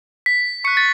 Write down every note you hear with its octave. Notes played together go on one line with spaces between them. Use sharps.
B6
C#6 F#6 C#7
A6